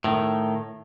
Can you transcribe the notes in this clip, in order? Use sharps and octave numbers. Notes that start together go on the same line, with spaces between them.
A2 D#3